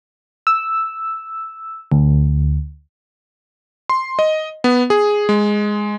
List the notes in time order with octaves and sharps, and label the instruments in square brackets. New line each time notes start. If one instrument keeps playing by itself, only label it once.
[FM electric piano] E6
D2
[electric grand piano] C6
D#5
B3
G#4
G#3